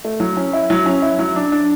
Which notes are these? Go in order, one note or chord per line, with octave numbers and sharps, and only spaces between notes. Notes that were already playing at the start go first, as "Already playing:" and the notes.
A3
F#3
C#4
E4
F#3
C#4
E4
F#3
D4
D4